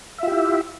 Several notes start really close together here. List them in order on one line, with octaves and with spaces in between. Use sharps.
E5 F4 G4 E4